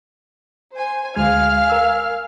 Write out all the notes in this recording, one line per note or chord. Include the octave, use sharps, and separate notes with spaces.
C5 G#5
D2 G#3 F5 G#5 F6 G#6
A#4 E6